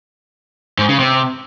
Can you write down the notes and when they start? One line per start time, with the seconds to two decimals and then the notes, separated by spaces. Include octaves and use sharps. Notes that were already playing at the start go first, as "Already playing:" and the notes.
0.78 G#2
0.89 C#3
0.99 C3